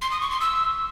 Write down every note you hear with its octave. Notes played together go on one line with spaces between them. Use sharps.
C6
D#6
C#6
C6
E6